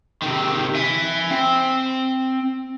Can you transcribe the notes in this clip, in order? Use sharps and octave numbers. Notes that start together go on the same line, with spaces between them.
C3 D#3
E5 G#5
C4